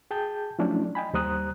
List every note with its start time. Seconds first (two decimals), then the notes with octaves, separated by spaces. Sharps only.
0.11 G#4 G5 A5 G6
0.59 F3 F#3 A3 C#4 D4 E4
0.95 D#5 G5 G#5 B5
1.13 D#2 G3 C5 A#5 D#6 F#6